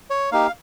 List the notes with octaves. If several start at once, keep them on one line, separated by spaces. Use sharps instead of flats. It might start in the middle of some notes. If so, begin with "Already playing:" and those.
C#5
A#3 D#4 G4 F5